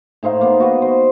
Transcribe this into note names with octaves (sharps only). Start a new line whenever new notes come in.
A2 D#4 C5 F5
A#3 B3
F#4 B4 D#5
C5